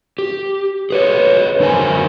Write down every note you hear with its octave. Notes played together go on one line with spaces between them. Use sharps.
G4
G#4 B4 C#5
F#2 D3 D#4 A#4 C5 G#5